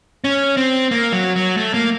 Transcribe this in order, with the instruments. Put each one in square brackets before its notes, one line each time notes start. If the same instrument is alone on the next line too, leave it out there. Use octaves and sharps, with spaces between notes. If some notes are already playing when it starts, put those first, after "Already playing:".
[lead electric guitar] C#4
C4
A#3
F#3
F#3
A3
A#3